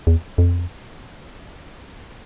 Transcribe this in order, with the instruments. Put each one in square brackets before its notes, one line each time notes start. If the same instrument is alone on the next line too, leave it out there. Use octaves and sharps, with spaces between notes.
[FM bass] E2
F2